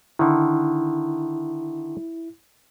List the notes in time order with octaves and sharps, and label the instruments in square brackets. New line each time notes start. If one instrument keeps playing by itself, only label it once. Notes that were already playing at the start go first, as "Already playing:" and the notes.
[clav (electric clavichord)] D3 D#3 [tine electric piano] E4